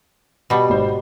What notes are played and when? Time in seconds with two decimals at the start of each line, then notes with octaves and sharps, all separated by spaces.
0.50 B2 G3
0.70 G#1 C5